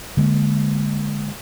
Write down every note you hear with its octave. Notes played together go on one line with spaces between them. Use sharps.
D3 G#3 A#3